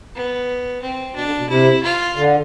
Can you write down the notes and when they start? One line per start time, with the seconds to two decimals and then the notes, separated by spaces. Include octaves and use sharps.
0.15 B3
0.82 C4
1.15 B2 D4
1.26 D3
1.38 B2
1.49 C3 E4
1.83 F4
2.16 D3